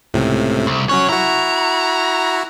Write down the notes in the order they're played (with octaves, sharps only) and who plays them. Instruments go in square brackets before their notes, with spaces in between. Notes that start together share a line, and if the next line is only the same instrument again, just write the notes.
[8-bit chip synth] C#2 A2 C3
[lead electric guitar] C2
[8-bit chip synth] F#3 C#4 F#6 [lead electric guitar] C#5
[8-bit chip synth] E4 F#4 [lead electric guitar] A#5